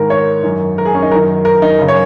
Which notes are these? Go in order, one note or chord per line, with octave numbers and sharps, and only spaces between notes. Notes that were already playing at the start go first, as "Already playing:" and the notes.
Already playing: G#2 D#3 A#4
C#5
F#2 D#3
A#4
G#4
C#4
D#4
F#2 A#4
D#3
A#4
D#4
F#2 C#3
C#5